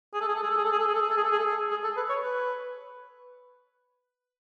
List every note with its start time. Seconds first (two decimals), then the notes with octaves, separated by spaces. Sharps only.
0.14 G#4
0.21 A4
0.28 G#4
0.35 A4
0.43 G#4
0.51 A4
0.57 G#4
0.65 A4
0.72 G#4
0.80 A4
0.87 G#4
0.95 A4
1.02 G#4
1.09 A4
1.17 G#4
1.24 A4
1.32 G#4
1.39 A4
1.46 G#4
1.71 G#4
1.84 A4
1.97 B4
2.09 C#5
2.22 B4